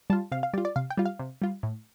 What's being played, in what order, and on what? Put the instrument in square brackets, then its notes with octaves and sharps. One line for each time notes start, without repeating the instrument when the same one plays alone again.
[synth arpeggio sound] G3 F4 A5
C3 F5
F5
G3 D5
F4
D5
C3 F5
G5
G3 F4
F5
C3
G3 F4
A2